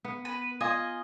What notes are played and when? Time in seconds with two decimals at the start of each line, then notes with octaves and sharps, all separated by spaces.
0.04 B3
0.25 B4
0.61 F4 D#5 G#5